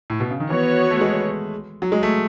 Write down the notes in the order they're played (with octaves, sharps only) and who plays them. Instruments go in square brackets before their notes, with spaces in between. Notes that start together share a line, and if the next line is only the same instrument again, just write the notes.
[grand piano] A2
B2
C#3
D#3
[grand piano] E3 [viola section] B3 F#4 C#5
[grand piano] A3
G#3
F#3
G#3
A3